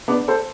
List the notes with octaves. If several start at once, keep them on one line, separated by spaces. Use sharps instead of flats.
B3 D4
A4 C5